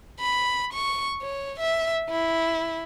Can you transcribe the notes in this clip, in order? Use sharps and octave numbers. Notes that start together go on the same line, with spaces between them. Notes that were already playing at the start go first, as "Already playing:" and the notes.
B5
C#6
C#5
E5
E4